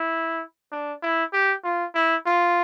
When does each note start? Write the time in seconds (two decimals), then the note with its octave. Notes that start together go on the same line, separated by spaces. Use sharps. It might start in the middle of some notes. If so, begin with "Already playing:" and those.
Already playing: E4
0.71 D4
1.02 E4
1.33 G4
1.64 F4
1.94 E4
2.26 F4